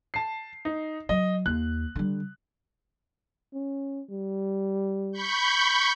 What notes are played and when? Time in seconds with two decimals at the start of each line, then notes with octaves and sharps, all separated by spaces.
0.14 A5 C7
0.65 D#4
1.09 F#3 D#5
1.46 D#2 F#6
1.96 D3 G3
3.53 C#4
4.10 G3
5.12 B5 C#6 G6